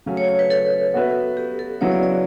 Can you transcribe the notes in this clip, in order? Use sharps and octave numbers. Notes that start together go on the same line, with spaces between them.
C#3 F#3 A3 C#4
C#5
C#5
B4
A4
B3 F#4 B4 E5
G4
A4
C#3 F#3 B3 E4 C#5
D5
D5